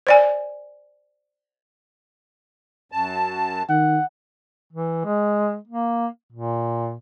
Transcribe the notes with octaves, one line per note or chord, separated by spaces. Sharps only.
C5 D5 G#5
F#2 A5
D#3 F#5
E3
G#3
A#3
A#2